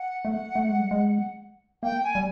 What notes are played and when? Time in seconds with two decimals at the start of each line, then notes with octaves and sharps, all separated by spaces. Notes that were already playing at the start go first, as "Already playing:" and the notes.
Already playing: F#5
0.25 A3
0.55 A3
0.69 G#3
0.80 G3
0.91 G#3
1.83 A#3 G5
2.04 G#5
2.15 G3